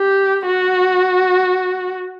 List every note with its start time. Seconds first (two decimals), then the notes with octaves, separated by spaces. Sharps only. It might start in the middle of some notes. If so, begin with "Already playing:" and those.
Already playing: G4
0.46 F#4